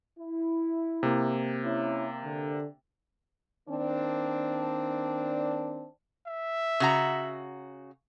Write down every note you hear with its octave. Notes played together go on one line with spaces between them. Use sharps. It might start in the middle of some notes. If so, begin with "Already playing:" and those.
E4
C3 A#3
C#4 E4
D3
D#3 A#3 C4 D4
E5
C#3 F#4 A#5